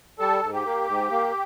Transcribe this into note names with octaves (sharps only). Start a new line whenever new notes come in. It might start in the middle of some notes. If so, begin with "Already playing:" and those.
G3 A4
G#2
G4
A#3
G#2
A#3